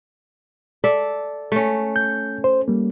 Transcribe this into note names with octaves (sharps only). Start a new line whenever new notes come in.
A4 D5 E5
A3 C#4
G6
C5
G3 A#3